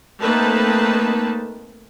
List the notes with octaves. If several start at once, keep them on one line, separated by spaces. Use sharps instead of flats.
A3 A#3 C4 D#4 B4 A5